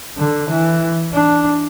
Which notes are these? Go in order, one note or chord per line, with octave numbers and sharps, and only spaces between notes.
D3
E3
D4